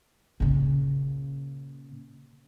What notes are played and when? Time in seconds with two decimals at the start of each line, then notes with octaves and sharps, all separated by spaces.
0.40 A#2 C#3